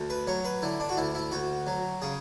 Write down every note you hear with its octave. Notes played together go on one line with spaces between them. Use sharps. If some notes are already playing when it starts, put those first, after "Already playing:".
Already playing: D2
B4
F#3 C#5
B4
D3 E4
D4
F#4
D2 E4
E4
D2 F#4
F#3
C#3 G#4